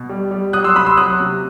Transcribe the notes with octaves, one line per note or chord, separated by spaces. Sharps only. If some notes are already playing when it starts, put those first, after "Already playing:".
Already playing: B2
G3
G3
F#3 D#6 F#6
C6 E6
C3 B5 D#6
C6 E6
F#3 D#6 F#6
C3